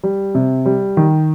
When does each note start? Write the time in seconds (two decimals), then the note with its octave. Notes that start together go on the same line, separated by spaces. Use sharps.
0.04 G3
0.35 C3
0.66 G3
0.97 D#3